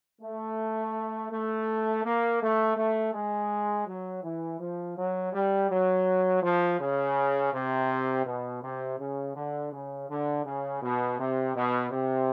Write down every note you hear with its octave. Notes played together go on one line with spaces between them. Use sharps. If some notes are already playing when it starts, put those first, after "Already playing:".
A3
A3
A#3
A3
A3
G#3
F#3
E3
F3
F#3
G3
F#3
F3
C#3
C3
B2
C3
C#3
D3
C#3
D3
C#3
B2
C3
B2
C3